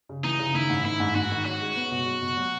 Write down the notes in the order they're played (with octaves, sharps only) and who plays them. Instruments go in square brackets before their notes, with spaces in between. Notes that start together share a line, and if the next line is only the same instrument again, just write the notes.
[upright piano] C#3
[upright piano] E3 [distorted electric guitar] D#4
[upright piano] C#3
[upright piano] D#3 [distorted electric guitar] E4
[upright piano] G#2
[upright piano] D#3 [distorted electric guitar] E4
[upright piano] G#2
[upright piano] G#2 [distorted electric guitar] F#4
[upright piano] D#3
[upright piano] C#4 [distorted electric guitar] F#4
[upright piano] G#3
B3
B2
F#3
B2
F#3